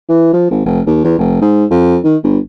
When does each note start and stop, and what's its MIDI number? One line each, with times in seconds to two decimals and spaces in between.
0.09 0.32 52
0.34 0.49 53
0.51 0.64 32
0.66 0.81 29
0.87 1.04 39
1.04 1.17 40
1.19 1.37 29
1.42 1.65 44
1.71 1.98 41
2.04 2.17 51
2.24 2.38 31